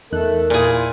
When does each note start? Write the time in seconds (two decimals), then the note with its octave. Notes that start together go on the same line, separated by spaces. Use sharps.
0.12 E2 A3 D#4 A4 A#4 F#6
0.51 A#2 E4 F4 G#4